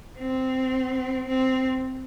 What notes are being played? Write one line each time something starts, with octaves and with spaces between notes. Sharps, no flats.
C4
C4